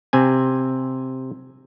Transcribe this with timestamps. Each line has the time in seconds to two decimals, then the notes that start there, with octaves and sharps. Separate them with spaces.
0.13 C3 C4 G#5